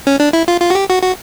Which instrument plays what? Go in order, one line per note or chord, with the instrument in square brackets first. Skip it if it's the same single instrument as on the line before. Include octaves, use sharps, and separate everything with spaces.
[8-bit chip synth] C#4
D4
E4
F4
F4
F#4
G4
F#4
F#4